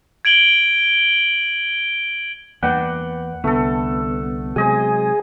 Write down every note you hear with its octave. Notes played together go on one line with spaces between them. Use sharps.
G#6 D7 F#7 G7
E2 A#3 B4 D5 F#5 G5
C2 D3 A3 B3 A4
C3 F#3 G#3 G#4 C5 D#5 G#5